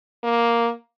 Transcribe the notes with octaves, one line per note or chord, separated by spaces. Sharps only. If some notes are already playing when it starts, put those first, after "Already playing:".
A#3